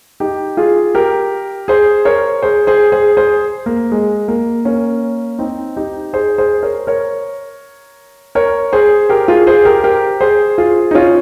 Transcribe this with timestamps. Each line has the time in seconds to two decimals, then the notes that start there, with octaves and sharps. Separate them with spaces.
0.20 D#4 G4
0.57 F4 G#4
0.94 G4 A#4
1.68 G#4 C5
2.05 A#4 C#5
2.43 G#4 C5
2.67 G#4 C5
2.92 G#4 C5
3.17 G#4 C5
3.66 A#3
3.92 G#3
4.28 A#3
4.65 A#3 C#4
5.39 C4 D#4
5.77 D#4 G4
6.13 G#4 C5
6.38 G#4 C5
6.63 A#4 C#5
6.87 A#4 C#5
8.35 A#4 C#5
8.73 G#4 C5
9.09 G4 A#4
9.28 F4 G#4
9.47 G#4 C5
9.65 G4 A#4
9.84 G4 A#4
10.21 G#4 C5
10.58 F4 G#4
10.91 D#4
10.95 C#4 F4